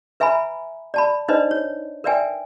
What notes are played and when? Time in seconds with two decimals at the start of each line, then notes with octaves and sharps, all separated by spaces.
0.20 B4 E5 G#5 A#5 B5
0.94 D5 A5 B5
1.28 D4 D#4 B4 C5 D5 D#5
1.51 C#5
2.04 A#4 B4 D5 E5 G5 G#5